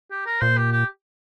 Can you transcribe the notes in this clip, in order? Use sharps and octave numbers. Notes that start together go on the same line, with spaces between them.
G4
A#4
A#2 C5
G4
G4